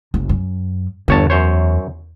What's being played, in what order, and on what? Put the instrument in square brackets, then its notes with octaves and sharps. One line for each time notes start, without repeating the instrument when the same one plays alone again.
[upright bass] F#1
F#2
[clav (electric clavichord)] G1 C#5 A5 [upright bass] E2
[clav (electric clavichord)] F#2 C5 C#5